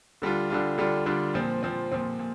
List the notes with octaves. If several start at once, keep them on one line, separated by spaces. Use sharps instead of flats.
D3 G3 D4 F4
D3 G3 D4 F4
D3 G3 D4 F4
D3 G3 D4 F4
A#2 F3 C4
A#2 F3 C4
A#2 F3 C4
A#2